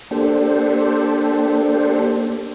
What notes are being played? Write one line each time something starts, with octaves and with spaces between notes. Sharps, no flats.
A#3 D4 G4 A4 C5